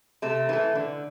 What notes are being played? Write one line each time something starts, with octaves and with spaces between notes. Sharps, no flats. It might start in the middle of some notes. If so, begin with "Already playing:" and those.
C3 A3
E3 A3
D3